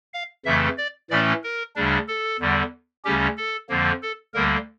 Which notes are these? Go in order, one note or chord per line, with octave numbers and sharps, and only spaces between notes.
F5
F2 C#3 E3 A3 E5
D5
A2 E3 A3 C#4 D5
A#4
D2 C#3 G3 D4
A4
E2 D3 G3
D2 C#3 G3 C#4 G4
A4
F2 D3 F3 A#3
A4
D2 D3 G3 A#3 A#4